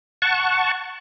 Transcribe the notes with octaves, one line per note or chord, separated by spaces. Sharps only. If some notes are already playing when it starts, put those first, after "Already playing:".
F#5 A5 C#6